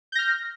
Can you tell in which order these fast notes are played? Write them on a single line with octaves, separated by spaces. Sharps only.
G6 A#6 F6